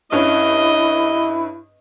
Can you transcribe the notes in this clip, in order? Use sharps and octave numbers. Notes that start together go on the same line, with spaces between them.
G2 C#4 E4 D#5